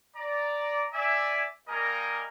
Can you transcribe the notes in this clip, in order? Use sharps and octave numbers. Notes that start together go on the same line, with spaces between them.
D5 A#5
D5 E5 G#5
G3 A#3 A#4 D#5 G#5 A#5